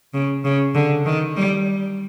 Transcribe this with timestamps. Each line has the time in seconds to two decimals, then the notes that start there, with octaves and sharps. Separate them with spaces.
0.14 C#3
0.44 C#3
0.75 D3
1.06 D#3
1.36 G3